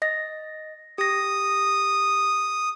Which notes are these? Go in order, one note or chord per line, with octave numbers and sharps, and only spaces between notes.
D#5 A#6
G4 D#6 A#6